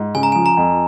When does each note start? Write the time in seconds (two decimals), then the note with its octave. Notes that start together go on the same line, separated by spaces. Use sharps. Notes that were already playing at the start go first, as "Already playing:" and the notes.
Already playing: G#2
0.15 C#3 G#5
0.23 A#5
0.32 F3 G#5
0.46 A#5
0.57 F2